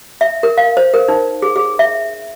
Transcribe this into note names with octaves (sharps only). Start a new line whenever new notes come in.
E5
A#4
F5
C5
A#4
D#4
G#4
G#4
E5